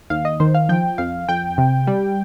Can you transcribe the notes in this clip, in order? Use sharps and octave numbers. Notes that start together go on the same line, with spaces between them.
D#2 F5
D#5
D#3 C5
F5
F3 G5
F2 F5
F2 G5
C3
G3